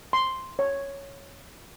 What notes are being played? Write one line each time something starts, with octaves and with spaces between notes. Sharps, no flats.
C6
C#5